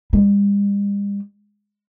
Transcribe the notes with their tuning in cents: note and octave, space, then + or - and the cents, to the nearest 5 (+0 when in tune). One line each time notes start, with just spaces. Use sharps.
G3 +45